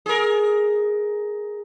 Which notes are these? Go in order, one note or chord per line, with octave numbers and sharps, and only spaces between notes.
G#4 A#4